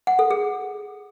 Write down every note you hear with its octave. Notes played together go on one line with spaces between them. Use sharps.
F#5
A4
G#4